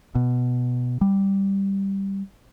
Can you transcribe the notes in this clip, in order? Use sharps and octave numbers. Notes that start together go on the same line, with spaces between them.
B2
G3